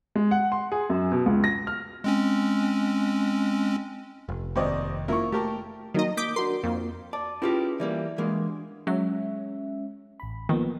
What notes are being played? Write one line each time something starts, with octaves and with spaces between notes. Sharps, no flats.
G#3
F#5
C6
G#4
F#2
B2
C#2
A#6
F6
G#3 C4 C#4
F1
D#2 C3 C5 D5 D#5
A#3 E4 F4 A#4 C#6
A3 G4 A#4 A5
D#3 F#3 A#3 D#4 D#5
A#3 D6 D#6 G6 B6
D4 F#4 A#4 C6
F2 A#3
D5 A5 D6
C#4 E4 F4 G4 G#4 B4
E3 G3 A#3 D5 E5
E3 G#3 A#3 D4 F#4
F#3 G#3 C#4 E5
A1 B5
D#3 F3 A#3 B3